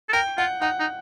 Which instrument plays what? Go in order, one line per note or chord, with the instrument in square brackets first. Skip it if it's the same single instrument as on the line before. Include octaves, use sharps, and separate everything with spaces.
[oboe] A4
[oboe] A#4 [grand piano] G5
[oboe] F4 [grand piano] F#5
[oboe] D#4 [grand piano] F#5
[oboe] D#4